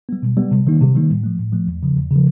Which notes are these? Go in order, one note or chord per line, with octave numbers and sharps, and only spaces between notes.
G3 B3
B2
G3 B3
C3
D#3 G3 A#3 D#4
C3
D#3 G3 A#3 D#4
A2
F3 A3
A2
F3 A3
E2
C#3 F3
E2
C#3 F3